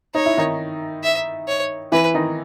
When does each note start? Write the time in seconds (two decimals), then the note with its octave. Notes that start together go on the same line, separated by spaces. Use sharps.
0.15 D#4 C#5
0.26 E4
0.37 D#3 D#4
1.03 E5
1.48 C#5
1.92 E3 E4 B4
2.14 D#3 D#4